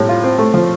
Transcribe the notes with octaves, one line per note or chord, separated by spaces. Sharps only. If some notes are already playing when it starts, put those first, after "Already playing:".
Already playing: A2 G3 C4
F4
C4
A3
F3